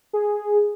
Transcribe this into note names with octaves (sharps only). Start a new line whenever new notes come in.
G#4